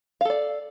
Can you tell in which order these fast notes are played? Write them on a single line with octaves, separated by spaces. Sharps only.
F5 A4 D5